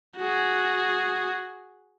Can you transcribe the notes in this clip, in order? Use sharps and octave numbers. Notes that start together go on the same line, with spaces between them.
F#4 G#4